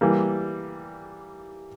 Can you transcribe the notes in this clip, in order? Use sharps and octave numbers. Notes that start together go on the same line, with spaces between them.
E3 G3 A#3